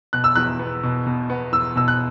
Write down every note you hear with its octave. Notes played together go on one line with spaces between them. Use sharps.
B2 F#6
E6
E2 F#6
B3
B2
B2
B3
E2 E6
B2 E6
F#6